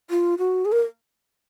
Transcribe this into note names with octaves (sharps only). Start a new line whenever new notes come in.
F4
F#4
G#4
A#4